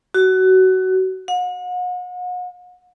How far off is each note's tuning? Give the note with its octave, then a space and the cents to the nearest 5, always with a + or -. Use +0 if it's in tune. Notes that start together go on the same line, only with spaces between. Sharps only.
F#4 +20
F#5 -40